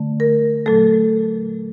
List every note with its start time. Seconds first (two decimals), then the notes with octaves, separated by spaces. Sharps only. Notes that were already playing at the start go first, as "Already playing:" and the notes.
Already playing: D3 A3
0.20 A#4
0.66 A#2 F#3 A3 A4